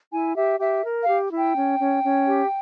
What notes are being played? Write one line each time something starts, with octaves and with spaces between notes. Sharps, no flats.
E4 G#5
G4 E5
G4 E5
A#4
F5
G4
E4
G5
C#4
C#4
C#4
G4